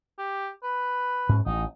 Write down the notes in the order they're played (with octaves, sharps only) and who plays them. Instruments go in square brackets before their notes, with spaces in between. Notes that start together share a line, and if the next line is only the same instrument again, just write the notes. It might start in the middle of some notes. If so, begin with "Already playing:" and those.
[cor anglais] G4
B4
[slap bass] G#2 C#4
[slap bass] A1 [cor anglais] D#4